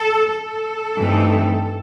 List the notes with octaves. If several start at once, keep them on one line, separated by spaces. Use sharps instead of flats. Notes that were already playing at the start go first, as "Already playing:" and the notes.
Already playing: A4
A4
G2 E3 A3 C4 D#4